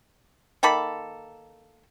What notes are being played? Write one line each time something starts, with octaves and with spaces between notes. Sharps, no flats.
D#3 A#3 A4 B5